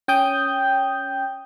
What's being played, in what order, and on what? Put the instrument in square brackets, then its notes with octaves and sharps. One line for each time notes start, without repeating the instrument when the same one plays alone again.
[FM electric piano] C#4 G5 D#6 G6